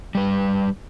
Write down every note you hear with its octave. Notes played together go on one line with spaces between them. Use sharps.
G3 B4